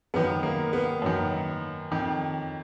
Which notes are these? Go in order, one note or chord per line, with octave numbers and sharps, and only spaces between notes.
F#2 D#3 B3
A#3
B3
F#2 D#3
F2 D#3